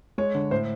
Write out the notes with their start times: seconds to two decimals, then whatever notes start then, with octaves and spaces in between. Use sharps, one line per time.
0.18 G#3 C#5
0.35 D3
0.51 A2 C5